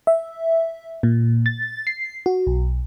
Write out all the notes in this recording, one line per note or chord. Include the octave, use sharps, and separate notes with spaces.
E5
A#2
A6
C7
F#4
B1